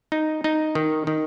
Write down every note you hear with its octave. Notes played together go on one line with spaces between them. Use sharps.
D#4
D#4
D#3
D#3